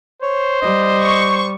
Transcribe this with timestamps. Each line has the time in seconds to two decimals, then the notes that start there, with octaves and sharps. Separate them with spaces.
0.23 C5 C#5
0.62 G3 D#5
1.02 C#6